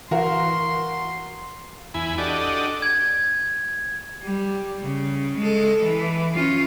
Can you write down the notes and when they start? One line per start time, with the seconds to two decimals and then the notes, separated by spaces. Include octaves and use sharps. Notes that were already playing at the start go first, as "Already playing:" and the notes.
0.11 E3 F#4 A#4 F5 C6
1.94 E2 E4 G#5 B5
2.18 D4 F#4 G4 A4 D5 D#5
2.82 G#6
4.23 G3
4.82 C#3
5.37 G#3 A4
5.83 E3
6.34 C#4 F4